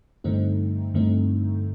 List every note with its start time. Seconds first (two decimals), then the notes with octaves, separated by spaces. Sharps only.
0.24 G2 D3 A3 C4 D#4
0.94 G2 D3 A3 C4 D#4